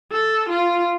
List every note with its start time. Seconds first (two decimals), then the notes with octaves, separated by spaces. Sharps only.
0.12 A4
0.49 F4